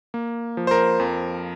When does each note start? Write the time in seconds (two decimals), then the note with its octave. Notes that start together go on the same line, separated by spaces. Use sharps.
0.14 A#3
0.57 F3
0.67 C5
0.71 A#4
1.00 F2